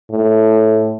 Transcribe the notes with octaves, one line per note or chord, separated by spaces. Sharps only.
A2